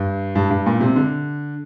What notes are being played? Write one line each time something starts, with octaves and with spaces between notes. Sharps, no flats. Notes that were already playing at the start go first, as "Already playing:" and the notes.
Already playing: G2
G2
G2
A#2
C3
D3